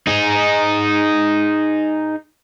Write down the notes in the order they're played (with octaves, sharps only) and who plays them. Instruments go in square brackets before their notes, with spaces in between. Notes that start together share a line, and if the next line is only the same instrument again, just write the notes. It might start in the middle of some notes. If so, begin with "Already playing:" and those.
[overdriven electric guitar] D#4 G#4